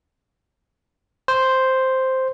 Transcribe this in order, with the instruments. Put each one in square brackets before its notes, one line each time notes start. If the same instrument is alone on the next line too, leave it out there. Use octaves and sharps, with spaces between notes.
[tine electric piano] C5